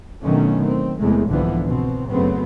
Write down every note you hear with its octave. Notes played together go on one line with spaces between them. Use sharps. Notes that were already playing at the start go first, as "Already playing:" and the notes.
B2 D3 D#3 F#3 A3 C#4
C4
E2 C3 G#3 A3
C2 G#2 D3 E3 F3 B3
B2 C4
F#2 C#3 F#3 A3 B3 C4